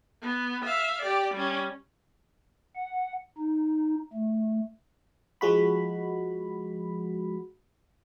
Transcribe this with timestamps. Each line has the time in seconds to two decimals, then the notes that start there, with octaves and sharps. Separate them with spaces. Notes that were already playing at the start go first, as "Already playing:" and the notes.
0.22 B3
0.65 E5 F5
1.02 G4 D5
1.34 G3 C#4
2.76 F#5
3.38 D#4
4.13 A3
5.41 F3 G#3 F#4 B5